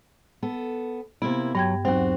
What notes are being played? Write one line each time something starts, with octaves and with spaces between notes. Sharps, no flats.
B3 A4
C3 A#3 B3 E4
G2 F#3 G5 G#6
D#2 F#3 C4 F#4